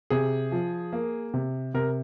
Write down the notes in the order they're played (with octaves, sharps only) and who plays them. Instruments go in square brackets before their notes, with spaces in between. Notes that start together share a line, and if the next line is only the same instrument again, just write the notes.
[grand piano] C3 G#4
F3
A#3
C3
C3 A#4